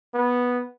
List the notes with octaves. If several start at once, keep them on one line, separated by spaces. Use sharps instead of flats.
B3